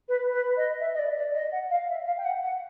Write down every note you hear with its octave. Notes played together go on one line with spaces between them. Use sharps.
B4
B4
D#5
E5
D#5
D5
D5
D#5
F#5
F5
E5
F5
G5
F#5
F#5